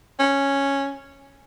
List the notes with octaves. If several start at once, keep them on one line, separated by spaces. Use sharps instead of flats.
C#4